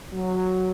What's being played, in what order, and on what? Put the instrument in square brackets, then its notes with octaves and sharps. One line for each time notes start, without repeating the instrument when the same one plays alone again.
[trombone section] F#3